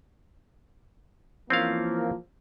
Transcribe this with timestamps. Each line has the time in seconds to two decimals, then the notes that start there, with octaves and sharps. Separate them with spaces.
1.50 E3 F3 A#3 C4 C#4 F5